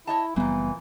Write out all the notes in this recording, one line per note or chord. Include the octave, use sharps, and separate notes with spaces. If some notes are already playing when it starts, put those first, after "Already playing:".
E4 C#5 D#5 A5
F#1 F2 A#2 E3 G3 B3